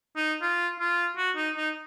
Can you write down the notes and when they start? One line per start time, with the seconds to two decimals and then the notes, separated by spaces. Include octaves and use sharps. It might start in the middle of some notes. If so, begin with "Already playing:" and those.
0.16 D#4
0.42 F4
0.80 F4
1.17 F#4
1.36 D#4
1.57 D#4